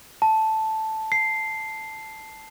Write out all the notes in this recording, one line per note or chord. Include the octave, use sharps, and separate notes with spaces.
A5
C7